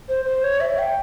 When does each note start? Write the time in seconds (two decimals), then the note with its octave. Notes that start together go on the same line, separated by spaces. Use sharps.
0.09 C5
0.25 C5
0.44 C#5
0.60 E5
0.78 G5